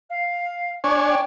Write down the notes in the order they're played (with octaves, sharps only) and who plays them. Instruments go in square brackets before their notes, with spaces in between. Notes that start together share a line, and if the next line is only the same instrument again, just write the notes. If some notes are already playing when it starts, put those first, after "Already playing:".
[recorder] F5
[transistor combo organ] D4 C#5 G#5 [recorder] C#6
[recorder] G5